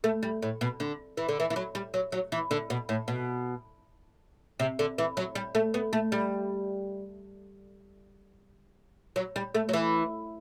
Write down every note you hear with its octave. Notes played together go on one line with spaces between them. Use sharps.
A3
G3
A2
B2
D3
E3
D3
E3
E3
F#3
G3
F#3
F#3
E3
D3
B2
A2
B2
C3
D3
E3
F#3
G3
A3
B3
A3
G3
F#3
G3
A3
F#3
E3